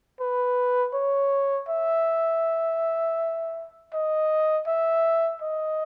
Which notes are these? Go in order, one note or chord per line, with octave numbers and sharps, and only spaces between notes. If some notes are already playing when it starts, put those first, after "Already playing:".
B4
C#5
E5
D#5
E5
D#5